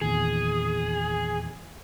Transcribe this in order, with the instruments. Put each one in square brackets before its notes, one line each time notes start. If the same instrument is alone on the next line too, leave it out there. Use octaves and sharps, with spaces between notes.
[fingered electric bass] E2 A#2 D#3 [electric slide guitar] G#4